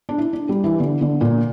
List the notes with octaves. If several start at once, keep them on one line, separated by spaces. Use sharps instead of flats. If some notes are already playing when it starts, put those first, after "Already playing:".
D4
E4
D4
G3
E3
D3
D3
A#2